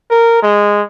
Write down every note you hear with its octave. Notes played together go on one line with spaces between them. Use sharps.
A#4
G#3